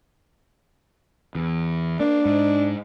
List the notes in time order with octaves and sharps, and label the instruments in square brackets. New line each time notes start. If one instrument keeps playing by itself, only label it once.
[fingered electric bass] E2
[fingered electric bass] A#3 [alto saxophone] D4
[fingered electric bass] G#2